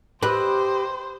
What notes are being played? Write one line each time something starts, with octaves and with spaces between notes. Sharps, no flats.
G4 B4 C5 D#5 E6